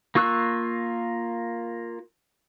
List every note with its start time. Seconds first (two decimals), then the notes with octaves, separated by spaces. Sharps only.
0.15 A#3 F4 C#6 E6 F#6